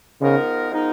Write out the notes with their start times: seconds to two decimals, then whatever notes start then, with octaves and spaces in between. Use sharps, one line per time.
0.21 C#3 F3 G#3 B3 D#4 A#4
0.71 F3 G#3 B3 D#4 A#4